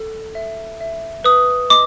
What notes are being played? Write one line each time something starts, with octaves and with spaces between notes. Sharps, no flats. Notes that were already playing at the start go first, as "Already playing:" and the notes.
Already playing: A4
E5
E5
B4 D#6
D#5 D6